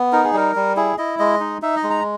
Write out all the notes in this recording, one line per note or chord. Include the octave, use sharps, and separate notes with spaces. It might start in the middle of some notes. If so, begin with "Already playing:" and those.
Already playing: B3
D#4 A#4
G#4
G3 A#4
G3
E4 G#4
E4 D#5
G#3 D#5
D#4
D#4 E5
D#5
G#3
A#5